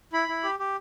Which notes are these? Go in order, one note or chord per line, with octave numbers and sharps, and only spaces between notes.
E4 B5
E4
G4
G4